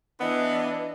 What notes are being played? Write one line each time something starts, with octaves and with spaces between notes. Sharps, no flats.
E3 B3 D4 D#5